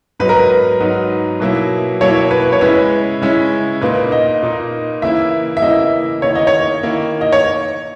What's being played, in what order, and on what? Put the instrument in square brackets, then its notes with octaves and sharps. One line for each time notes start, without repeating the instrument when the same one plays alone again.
[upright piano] G#2 F#3 B3 D#4 [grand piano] B4
[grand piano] A#4
B4
[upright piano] G#2 F#3 B3 D#4
B2 F#3 A#3 E4
[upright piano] B2 F#3 A#3 E4 [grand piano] C#5
[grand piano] B4
C#5
[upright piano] C#3 G#3 C#4 E4 [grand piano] B4
[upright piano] C#3 G#3 C#4 E4
[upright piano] A#2 A#3 D#4 [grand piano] B4
[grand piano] D#5
[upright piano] A#2 A#3 D#4
[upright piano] C#3 E3 A#3 E4 [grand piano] E5
[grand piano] E5
[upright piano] C#3 E3 A#3 E4 [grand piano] D#5
[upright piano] D#3 A#3 E4 [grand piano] C#5
[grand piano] D#5
C#5
[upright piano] D#3 A#3 E4
[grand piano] D#5
C#5